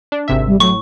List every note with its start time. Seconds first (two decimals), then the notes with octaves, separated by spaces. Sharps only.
0.12 D4
0.28 G#1 C3 E5
0.47 G3
0.60 A2 F#3 C#6